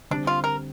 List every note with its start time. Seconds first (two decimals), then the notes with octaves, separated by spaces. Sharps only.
0.11 D3 G3 C4 D4
0.27 F4
0.44 A#4